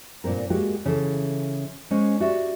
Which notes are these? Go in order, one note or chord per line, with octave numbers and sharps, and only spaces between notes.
G2 A#2 D#3 C4 A#4
G#3 A#3 F#4 G4
C#3 E3 A4
G#3 C#4 C5 D#5
F#4 G4 D5 E5